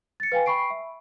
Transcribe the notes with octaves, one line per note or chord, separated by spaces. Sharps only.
A6 C#7
B4 F5 G5 G#5
G5 B5 C#6 C7 D7
E5